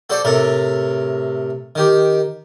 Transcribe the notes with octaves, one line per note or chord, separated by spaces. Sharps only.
F#4 A4 C5 D5
A2 C3 A4 A#4
D#3 G4